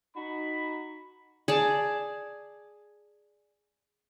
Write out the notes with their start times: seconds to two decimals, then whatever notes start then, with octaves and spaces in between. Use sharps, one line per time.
0.16 D#4 F#4 B5
1.48 G#4 D5 A5